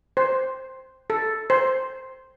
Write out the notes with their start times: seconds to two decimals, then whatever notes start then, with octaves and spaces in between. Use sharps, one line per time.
0.17 C5
1.10 A4
1.50 C5